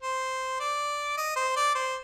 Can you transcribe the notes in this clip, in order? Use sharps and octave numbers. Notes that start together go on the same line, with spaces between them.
C5
D5
D#5
C5
D5
C5